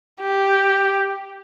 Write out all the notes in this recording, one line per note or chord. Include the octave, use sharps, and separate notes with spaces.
G4